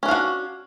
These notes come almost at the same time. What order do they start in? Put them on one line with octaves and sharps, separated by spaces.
C#4 D4 F5 F#4